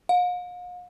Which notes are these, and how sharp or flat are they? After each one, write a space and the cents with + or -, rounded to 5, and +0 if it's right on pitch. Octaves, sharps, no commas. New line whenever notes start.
F5 +45